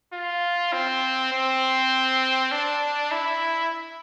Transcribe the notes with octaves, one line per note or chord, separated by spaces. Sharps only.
F4
C4
C4
D4
E4